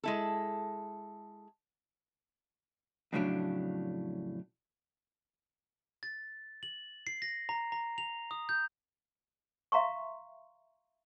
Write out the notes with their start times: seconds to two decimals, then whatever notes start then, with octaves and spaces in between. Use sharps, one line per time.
0.04 G#3 E4 A4
3.13 F2 A2 C#3 F#3 D4
6.03 A6
6.63 F#7
7.07 C7
7.22 A#6
7.49 A#5
7.72 A#5
7.98 F7
8.31 D#6
8.49 G6
9.72 E5 F5 A#5 C6 C#6